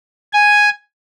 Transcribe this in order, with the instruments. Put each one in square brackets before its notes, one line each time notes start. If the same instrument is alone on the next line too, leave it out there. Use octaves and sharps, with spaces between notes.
[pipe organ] G#5